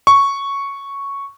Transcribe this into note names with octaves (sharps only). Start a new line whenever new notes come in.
C#6